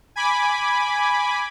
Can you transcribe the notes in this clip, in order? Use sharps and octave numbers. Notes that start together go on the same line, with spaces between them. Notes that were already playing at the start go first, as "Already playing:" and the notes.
G#5 B5 D6